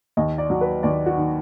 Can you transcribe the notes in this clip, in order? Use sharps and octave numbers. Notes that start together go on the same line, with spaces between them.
D#2 D#5
D5
F#3
B4
D#2 D5
F#4
D#3